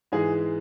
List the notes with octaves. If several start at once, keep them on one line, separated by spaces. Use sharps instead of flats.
G#2 E3 G#3 G#4